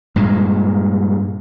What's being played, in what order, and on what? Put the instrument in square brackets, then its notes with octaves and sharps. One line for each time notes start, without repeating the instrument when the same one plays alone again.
[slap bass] G2 A#2 G#3